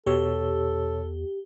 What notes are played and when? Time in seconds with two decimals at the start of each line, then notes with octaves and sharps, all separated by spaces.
0.06 E2 B2 G4 A4 C#5 E6